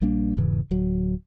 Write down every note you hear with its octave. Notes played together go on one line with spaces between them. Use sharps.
A#1 G3 A#3 D4
E1 G#2 C#3 E3
D1 F#3